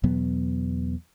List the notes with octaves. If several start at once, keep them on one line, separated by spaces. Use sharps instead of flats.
E2 B2 F#3 B3